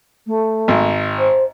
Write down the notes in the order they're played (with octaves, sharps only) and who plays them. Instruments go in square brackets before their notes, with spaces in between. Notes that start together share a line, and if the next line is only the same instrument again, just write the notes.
[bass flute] A3
[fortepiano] G#1
[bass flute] C5